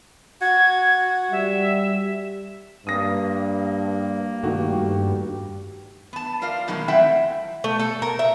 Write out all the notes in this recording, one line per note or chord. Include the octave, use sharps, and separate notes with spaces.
F#4 G#6
G3 E5
G2 A#3 D#6 A#6
G2 D#3 A3 F#4 G4
B3 A5
F4 A#4 D5 F5
B2 D#3 F#3 G#3 A#3
A3 C4 E4 E5 F#5 G5
A3
A4
A#4
E5